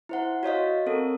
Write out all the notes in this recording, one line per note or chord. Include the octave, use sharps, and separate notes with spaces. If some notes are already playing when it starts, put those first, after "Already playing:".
E4 C5 F#5
F#4 C#5 D#5 F5
C4 A4 A#4